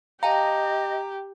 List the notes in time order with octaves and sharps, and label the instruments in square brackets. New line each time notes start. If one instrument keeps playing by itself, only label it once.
[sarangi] G4 [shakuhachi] D#5 [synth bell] F5 G5 A5 [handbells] A#5